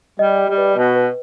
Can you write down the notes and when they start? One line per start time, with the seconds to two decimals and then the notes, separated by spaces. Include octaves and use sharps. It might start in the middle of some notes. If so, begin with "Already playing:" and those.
0.19 G3 D#5
0.38 G5
0.48 G3
0.57 B4
0.75 B2 B4
0.95 B4